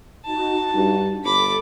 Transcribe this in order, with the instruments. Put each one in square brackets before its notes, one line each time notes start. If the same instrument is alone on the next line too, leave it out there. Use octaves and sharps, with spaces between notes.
[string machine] D#4 F#4 [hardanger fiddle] A5
[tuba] G2
[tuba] G1 [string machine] A4 [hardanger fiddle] B5 D6